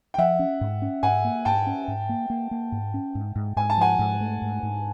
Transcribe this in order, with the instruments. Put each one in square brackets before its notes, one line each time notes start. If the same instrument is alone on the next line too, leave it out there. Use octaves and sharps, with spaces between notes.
[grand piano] G5
[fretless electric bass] F3 [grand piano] E5 F#5
[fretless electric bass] C#4
G#2
C#4
[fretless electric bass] G#2 [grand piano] F#5 G#5
[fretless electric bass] A#3
[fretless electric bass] G#2 [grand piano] G5 A5
[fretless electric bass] C#4
G#2
A#3
A#3
A#3
G#2
C#4
G#2
G#2
[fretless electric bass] G#2 [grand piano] G#5
[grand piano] A5
[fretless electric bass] F3 [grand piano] F#5 G#5
[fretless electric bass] G#2
A3
G#2
G#2